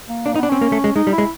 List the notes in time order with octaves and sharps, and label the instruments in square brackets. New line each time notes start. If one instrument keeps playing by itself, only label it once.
[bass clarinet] A#3
[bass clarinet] A#3 [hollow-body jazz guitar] D4
[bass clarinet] B3 [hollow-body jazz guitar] D#4
[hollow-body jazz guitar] D4
[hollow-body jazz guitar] C4 [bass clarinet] C#4
[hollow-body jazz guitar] A#3
A3
G#3
[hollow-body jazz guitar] G#3 [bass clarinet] D#4
[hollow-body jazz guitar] G3
[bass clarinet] E4
[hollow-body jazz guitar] G#3